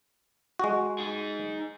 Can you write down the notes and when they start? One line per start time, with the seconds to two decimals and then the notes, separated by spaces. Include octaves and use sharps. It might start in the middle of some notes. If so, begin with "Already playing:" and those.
0.59 G#3 F#4
0.99 D#4 G#4